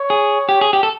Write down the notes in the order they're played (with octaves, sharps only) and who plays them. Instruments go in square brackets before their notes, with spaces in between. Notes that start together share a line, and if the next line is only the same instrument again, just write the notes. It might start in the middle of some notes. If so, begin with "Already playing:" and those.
Already playing: [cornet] C#5
[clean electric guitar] G#4
G4
G#4
G4
A4